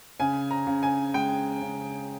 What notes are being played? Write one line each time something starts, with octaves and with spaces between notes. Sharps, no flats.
C#3 G#5
A#5
C#3
G#5
G#3 G5
C#3